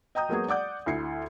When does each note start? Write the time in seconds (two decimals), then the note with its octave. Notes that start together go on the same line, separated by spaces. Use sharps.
0.15 D#5 G5 A#5 D#6 G6
0.29 F#3 G#3 A#3 B3 F#4 G#4
0.48 D5 F#5 D6 G6
0.86 D2 E4 C7 C#7